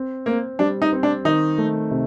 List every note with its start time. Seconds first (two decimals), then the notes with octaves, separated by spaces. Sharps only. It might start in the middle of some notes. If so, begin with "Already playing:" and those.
Already playing: C4
0.26 A#3 C4
0.59 G3 D4
0.82 D#4
0.93 C4
1.03 D4
1.25 D#3 D#4
1.58 A3
1.91 C3